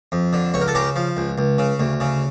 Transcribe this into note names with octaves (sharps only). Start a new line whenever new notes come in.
F2
D3
C#2 C#5
A#4
A4
C#3 G4 A#4
F3
C#2
C#2
C#3
D2
C#3